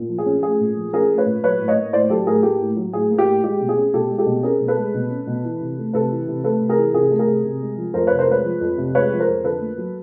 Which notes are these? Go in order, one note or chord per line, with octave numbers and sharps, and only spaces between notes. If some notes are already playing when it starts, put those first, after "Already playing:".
Already playing: A#2
F3
G#4
C#4
A3 G#4
A#2
F3
C#4 G#4 A#4
A3
B4 C#5
A#2
F#3 B4 C#5
A2
C#5 D#5
A#3
A2 C5 D5
F#3 G4 A4
A2 G#4 A#4
A#3 G4 A4
A2
F#3
A2 G#4
A#3
G4
A2
G#3 G4
B2
G#4
C#4
B2 G4 A4
G#3
G4 A4
B2
C#4 G#4 A#4
B2
A4 B4
G#3
B2
C#4
B2
E3
C3
A3
C3 A4 B4
E3
C3
A3 A4 B4
C3
G#4 A#4
E3
C3 G#4 A#4
A3
G#4 A#4
C3
C3
G#3
F3
F2 A#4 C5
C3 B4 C#5
A#4 C5
G#3 B4 C#5
F3
F2
C3
G#3 B4 C#5
F3
A#4 C5
F2
D3 A4 B4
A#3
F#3